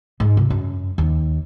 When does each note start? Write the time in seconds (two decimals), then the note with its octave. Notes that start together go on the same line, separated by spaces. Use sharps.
0.20 G#2
0.37 C3
0.50 F#2
0.98 D#2